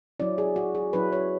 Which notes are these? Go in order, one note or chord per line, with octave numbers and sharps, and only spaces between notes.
F#3 C#4 E4 D5
G#4
F#4
G#4
F#3 C#4 E4 B4
C#5